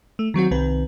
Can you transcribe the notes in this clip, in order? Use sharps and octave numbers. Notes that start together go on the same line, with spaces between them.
A3
D#3 F#3 C4 F#4
C2 D#3 C4 B4